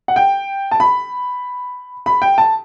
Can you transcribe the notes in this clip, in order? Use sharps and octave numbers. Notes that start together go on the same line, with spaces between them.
F#5
G5
A5
B5
B5
G5
A5